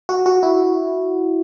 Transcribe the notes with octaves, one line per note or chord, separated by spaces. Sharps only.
F#4
F#4
E4